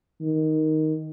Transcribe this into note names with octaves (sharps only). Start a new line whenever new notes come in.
D#3